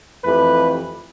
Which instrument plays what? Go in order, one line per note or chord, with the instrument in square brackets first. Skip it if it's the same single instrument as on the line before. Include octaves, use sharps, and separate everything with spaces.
[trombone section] F2 E3 A3 G4 B4